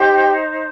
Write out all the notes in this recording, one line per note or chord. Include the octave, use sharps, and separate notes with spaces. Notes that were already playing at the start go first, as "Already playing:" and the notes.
Already playing: D#4 G4 C5 G5